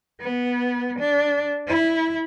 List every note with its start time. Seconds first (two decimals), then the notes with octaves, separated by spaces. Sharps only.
0.20 B3
0.99 D4
1.68 E4